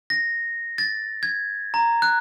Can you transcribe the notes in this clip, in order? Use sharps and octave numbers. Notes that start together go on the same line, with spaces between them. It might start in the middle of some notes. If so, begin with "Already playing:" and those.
A#6
A6
G#6
A#5
F#6